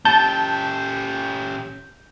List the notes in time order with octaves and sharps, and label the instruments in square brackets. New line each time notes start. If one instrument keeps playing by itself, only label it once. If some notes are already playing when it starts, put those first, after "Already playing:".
[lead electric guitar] C#4 G4 [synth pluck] A5 [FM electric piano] G6